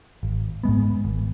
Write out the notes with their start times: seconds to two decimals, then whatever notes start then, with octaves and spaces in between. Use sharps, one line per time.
0.23 G#1
0.64 G#2 G#3 B3
1.05 G#1